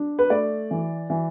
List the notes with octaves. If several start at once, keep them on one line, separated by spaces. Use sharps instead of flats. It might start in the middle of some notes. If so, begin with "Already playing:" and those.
Already playing: D4
B4
A3 D5
E3
E3